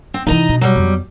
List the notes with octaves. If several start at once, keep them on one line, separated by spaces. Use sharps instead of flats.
C4
C3 E3 D#4 D#5 A#5
B2
F#3 G3
F2 B3